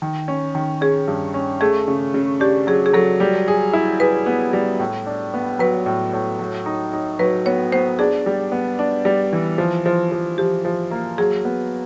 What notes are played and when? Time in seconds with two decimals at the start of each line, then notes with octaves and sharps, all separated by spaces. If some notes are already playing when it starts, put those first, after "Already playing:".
0.02 D#3
0.28 C#4
0.55 D#3
0.81 C#4 G#4
1.08 G2
1.34 C#4
1.60 A3 G#4
1.88 C#3
2.14 C#3
2.40 D4 G4
2.67 F#3 G#4
2.86 G#4
2.93 F#3 A4
3.20 G3
3.48 G#4
3.73 E4
4.00 G#4 B4
4.26 B3
4.53 G3
4.79 A2
5.06 D4
5.34 B3
5.59 F#3 B4
5.86 A2
6.13 A2
6.39 F#3
6.66 D#4
6.93 D#4
7.19 F#3 B4
7.46 B3 C#5
7.72 B3 C5
7.99 D4 G#4
8.26 G3
8.52 B3
8.79 D4
9.05 G3
9.33 E3
9.58 F3
9.86 F3
10.12 F3
10.38 F3 G4
10.65 F3
10.91 A#3
11.18 F#3 G#4
11.45 B3